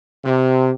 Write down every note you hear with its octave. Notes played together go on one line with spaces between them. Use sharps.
C3